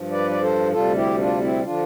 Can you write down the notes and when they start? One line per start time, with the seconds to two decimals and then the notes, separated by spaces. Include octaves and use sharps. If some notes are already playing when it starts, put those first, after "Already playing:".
Already playing: G2 F3
0.11 B4 D5
0.31 D5
0.41 A4 C5
0.72 D2 C3 G3 F4 A4
0.95 E4 G4
1.18 D4 F4
1.41 C4 E4
1.64 D3 F3 D4 F4